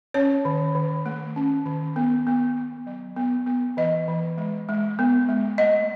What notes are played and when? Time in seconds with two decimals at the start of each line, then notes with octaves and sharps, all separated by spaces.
0.14 C#4 C#5
0.45 D#3
0.75 D#3
1.06 A3
1.36 C#4
1.66 D#3
1.96 B3
2.27 B3
2.56 B3
2.87 F#3
3.16 B3
3.47 B3
3.77 E3 D#5
4.08 E3
4.38 G#3
4.69 G#3
4.99 B3
5.29 G#3
5.58 A3 D#5